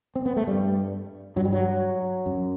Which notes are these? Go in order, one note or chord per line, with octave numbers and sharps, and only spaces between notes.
C4
B3
A3
G2 G3
G2 F#3
G3
F#3
F#2